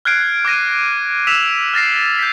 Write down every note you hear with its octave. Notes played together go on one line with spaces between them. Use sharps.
F6 F#6 G#6 C7 D7
D6 F6 A#6 D#7
E6 B6 E7 F7
F6 A6 A#6 C7
G6 B6